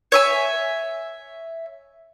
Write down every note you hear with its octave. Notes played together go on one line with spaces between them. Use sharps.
C#5 E5 G#5